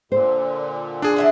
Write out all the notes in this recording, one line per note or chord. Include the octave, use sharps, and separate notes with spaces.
A#2 D3 C5
D4 G#4
E3 E5 F#5